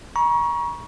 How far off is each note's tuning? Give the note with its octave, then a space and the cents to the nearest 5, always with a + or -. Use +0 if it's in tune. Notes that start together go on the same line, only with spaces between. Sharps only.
A#5 +35 C#6 +5